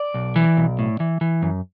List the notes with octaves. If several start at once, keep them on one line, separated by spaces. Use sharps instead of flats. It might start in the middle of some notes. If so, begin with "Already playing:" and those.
Already playing: D5
B1
E3
B1
A2
E3
E3
F#2